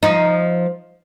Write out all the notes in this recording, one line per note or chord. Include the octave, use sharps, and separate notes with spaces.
F3 D#4